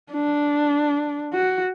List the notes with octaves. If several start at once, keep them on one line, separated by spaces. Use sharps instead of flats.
D4
F#4